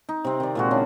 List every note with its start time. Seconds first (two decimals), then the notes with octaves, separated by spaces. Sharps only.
0.09 D#4
0.24 C3 C4
0.40 D#3 D5
0.55 A#2 G#3 F#4
0.71 C#3 D4